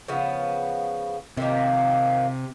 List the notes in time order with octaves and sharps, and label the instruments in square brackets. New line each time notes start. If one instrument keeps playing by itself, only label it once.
[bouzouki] C#3 F3 B3
[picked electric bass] C3 [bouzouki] D#3 F3 A#3